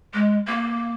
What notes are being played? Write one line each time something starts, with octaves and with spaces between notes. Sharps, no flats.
G#3
A#3